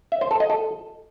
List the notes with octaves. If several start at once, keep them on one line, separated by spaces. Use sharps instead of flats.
E5
C5
A4
D#5
A4